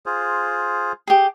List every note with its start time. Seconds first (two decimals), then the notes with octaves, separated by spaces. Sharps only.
0.06 F4 G#4 C5
1.07 G4 G#4